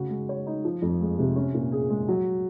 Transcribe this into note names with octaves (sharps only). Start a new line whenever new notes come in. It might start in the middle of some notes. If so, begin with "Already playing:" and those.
Already playing: C#3 F#4
G#3
C#5
D#4
F3
F2
G#3
C3
C#4
A#2
G#4
G#3
F#3